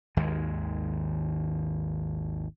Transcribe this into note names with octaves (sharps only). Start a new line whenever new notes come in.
G#1 D#2 D#3 G#3